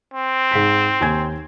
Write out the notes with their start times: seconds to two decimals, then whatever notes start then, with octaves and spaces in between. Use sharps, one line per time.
0.14 C4
0.51 G#2 B6
1.01 D#2 G#5 G#6